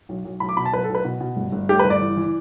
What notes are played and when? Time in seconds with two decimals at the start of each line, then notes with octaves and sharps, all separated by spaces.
0.09 B1
0.25 B1
0.40 B1 B5
0.49 D6
0.57 B2 B5
0.65 A5
0.73 B1 B4
0.84 A4
0.89 B1
0.95 B4
1.05 B2
1.21 B2
1.36 G1
1.52 G1
1.69 A3 G4
1.79 B4
1.85 G1
1.90 D5
2.01 E3
2.17 E3